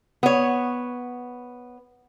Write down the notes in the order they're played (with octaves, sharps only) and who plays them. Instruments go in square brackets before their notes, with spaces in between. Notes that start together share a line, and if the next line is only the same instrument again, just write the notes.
[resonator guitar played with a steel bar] B3 C#5